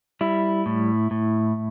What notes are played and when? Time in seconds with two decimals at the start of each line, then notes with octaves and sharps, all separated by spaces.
0.21 G3 E4
0.66 A2
1.11 A2